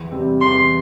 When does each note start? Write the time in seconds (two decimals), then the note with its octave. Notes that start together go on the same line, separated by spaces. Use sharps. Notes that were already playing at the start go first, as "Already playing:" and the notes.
Already playing: E2
0.11 C3 G3 C4
0.41 E2 C6